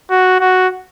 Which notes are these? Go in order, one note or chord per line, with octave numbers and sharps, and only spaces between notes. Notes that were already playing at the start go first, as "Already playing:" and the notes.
F#4
F#4